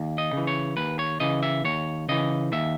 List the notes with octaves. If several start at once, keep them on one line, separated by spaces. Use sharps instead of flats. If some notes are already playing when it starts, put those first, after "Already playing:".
Already playing: D#2
D#5
C#3 E3
C#5
D#2 B4
C#5
C#3 E3 D#5
E5
D#2 C#5
C#3 E3 D#5
D#2 E5